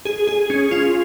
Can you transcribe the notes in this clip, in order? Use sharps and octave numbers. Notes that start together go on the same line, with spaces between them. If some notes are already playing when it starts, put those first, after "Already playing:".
G#4
G#4
C#4
F4